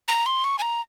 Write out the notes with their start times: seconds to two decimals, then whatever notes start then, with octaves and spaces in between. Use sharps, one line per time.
0.08 A#5
0.26 C6
0.44 C#6
0.59 G#5
0.62 A#5